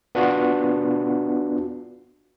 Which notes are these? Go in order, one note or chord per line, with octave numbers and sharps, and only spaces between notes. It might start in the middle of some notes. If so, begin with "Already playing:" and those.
B3 D4 F4 F#4